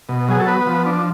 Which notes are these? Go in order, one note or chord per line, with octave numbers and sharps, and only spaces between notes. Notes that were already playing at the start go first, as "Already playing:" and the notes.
B2
F#3 G#4
A4
B3 B4
F3
D4